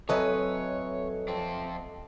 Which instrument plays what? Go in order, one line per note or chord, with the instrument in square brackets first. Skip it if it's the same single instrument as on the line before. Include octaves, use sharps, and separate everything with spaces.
[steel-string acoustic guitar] F#3 B4 G#5 [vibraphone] C4 [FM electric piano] A4 D#5 E5 [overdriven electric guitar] C#5
[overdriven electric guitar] F2 C4 [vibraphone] A5